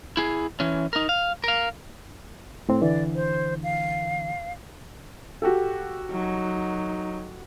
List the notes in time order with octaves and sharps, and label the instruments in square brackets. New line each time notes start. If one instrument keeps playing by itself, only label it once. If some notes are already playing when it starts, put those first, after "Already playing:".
[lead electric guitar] E4 G#4
E3 C#4
D#4 A#4
F5
A#4 F5
[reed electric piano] A2 C4
[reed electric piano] D3 E3 [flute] D5
[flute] C5
F5
[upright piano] F#4 G4 A4
[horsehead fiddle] F#3 D#4